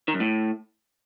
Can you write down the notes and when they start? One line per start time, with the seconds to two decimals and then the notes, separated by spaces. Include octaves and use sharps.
0.08 D#3
0.14 F#2
0.20 A2